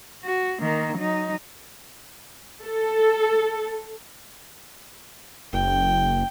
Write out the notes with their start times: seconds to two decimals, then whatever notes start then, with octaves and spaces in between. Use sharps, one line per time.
0.24 F#4
0.61 D#3 A#3
0.97 F#3 D#4
2.64 A4
5.53 F#1 G5